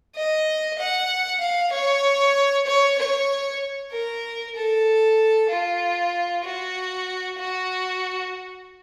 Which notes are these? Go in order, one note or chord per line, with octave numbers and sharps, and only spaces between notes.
D#5
F#5
F5
C#5
C#5
C#5
A#4
A4
F4
F#4
F#4